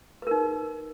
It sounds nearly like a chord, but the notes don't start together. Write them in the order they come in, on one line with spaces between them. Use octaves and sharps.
B4 A#4 D#4